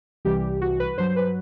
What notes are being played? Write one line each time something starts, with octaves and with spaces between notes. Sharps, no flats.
C2 C3 E3 G3 G4
F#4
B4
G2 F#3 C5
B4